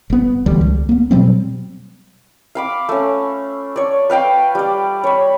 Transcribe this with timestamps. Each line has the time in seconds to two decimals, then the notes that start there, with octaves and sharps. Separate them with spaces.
0.10 G1 B3
0.46 D#1 D2 E3 G3
0.61 C#2
0.89 A#3 B3
1.11 B2 F#3 G3 C4
2.55 F5 B5 D6
2.89 A3 C#4
3.76 C#5 D5
4.10 B4 F5 G5 B5
4.55 G3 D5
5.04 C#5 B5